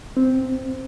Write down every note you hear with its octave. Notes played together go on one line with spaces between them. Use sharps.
C4